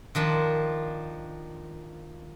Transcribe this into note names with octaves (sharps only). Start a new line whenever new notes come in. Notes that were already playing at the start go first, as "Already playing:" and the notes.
D#3 F3 D4